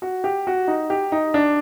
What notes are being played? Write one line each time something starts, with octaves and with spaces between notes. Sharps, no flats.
F#4
G4
F#4
D#4
G4
D#4
D4